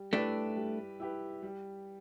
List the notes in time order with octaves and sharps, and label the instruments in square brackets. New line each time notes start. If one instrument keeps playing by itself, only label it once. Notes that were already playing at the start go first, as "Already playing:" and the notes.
Already playing: [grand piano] G3
[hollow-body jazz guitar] A3 D4 [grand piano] E4 G4 B4
[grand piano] G3
E4 G4 B4
G3